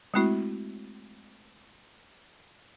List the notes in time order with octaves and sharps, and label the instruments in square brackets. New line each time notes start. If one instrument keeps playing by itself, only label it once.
[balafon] G#3 A3 C4 E4 F#4